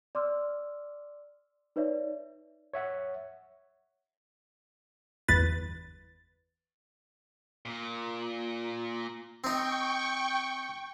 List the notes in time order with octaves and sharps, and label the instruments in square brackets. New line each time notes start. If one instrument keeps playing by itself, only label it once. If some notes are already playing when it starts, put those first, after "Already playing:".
[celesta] D5 C6 D6 E6 F6
D#4 B4 C#5 D5 E5
[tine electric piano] C#5 E5 F#5
[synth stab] G1 E2 B4 A6
[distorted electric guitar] A#2
[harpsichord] C4 D#4 [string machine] G5 C#6